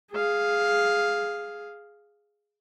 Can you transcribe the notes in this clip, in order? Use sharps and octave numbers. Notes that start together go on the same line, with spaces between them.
G#4 F5